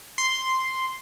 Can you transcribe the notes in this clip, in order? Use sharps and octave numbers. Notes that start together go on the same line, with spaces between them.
C6